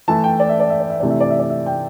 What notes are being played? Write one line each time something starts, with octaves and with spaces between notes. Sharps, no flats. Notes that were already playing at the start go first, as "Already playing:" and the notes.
E3 A3 E4 A5
G5
D5
E5
D5
E5
D5
E5
C3 E3 A3 D4 D5
E5
D5
E5
D5
E5
G5